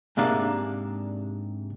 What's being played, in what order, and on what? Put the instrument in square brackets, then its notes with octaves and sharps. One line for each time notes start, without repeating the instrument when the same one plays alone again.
[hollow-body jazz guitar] G#2 C3 A#3 D4 G#4 F5